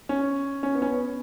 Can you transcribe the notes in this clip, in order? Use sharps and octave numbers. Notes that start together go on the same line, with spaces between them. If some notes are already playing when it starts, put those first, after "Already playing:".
C#4
C#4
B3
C#4
B3